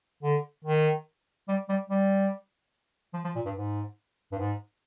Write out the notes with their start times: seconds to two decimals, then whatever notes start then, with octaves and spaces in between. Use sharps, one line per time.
0.23 D3
0.64 D#3
1.48 G3
1.69 G3
1.90 G3
3.13 F3
3.24 F3
3.35 A#2
3.46 G2
3.56 G#2
4.32 G2
4.39 G#2